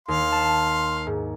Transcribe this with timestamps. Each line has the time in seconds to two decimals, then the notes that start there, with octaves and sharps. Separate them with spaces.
0.08 D#2 F5 C6
0.32 A5
1.07 G#2